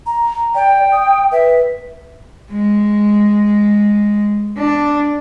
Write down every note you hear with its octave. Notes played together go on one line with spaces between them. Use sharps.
A#5
D5 G5
D#6
B4 E5
G#3
D4